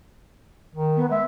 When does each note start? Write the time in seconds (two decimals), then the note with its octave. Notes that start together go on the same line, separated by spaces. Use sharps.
0.75 D#3
0.96 B3
1.10 G#3 E5